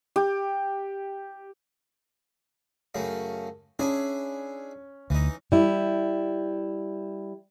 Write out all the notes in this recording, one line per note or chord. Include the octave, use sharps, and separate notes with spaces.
G4
F#2 C#3 A3
C#4 D4 E4 G#4
D2 E3 D#4
G3 E4